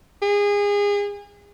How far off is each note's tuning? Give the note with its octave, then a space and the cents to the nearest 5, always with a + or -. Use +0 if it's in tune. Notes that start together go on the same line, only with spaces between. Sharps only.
G#4 -30